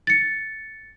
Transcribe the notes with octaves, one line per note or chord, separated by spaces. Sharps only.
A6 C#7